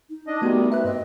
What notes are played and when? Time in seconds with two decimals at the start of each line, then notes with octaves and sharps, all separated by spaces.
0.10 D#4
0.27 D4 D#5
0.42 C3 D#3 G3 A3 B3 F#4
0.72 B4 E5 F#6
0.84 G2 C4 D#5